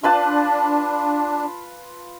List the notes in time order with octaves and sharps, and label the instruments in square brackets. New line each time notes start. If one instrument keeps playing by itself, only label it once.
[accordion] D4 [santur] F4 B4 A5